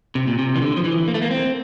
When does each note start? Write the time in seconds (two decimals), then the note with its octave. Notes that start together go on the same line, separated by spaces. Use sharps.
0.15 C3
0.27 A#2
0.39 C3
0.56 E3
0.62 D3
0.77 F3
0.85 E3
1.08 A#3
1.14 A3
1.22 A#3
1.31 C4